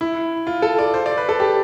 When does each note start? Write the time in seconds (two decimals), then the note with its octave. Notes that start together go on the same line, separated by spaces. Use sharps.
0.01 E4
0.47 F4
0.62 A4
0.79 D5
0.94 C5
1.06 D5
1.17 B4
1.29 A4
1.40 G4